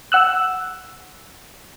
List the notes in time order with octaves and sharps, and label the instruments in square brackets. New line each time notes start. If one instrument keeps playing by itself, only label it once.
[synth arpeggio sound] F#5 E6 F#6